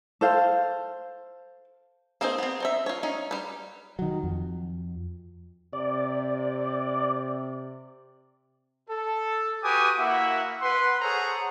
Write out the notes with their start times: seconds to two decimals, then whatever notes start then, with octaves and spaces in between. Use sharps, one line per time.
0.21 A4 C5 F5
2.21 A#3 C4 D#4 G#4 C5
2.38 B3 C4
2.60 C4 D#4 E5
2.86 F4 C#5
3.03 C#4 D#4
3.31 G3 B4
3.99 D#3 F#3
4.23 F2
5.73 C3 D5
8.90 A4
9.64 F#4 G4 B4 G#5 D6 D#6
9.98 A#3 E4 F#4 E5 F#5
10.62 B4 F#5 C6
11.01 G#4 A4 C5 C#5 F#5 A#5